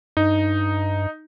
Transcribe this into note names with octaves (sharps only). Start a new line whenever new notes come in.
G2 D#4